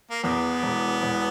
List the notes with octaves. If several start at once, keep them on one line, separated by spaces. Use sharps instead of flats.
A#3
E2 B3
E1
E1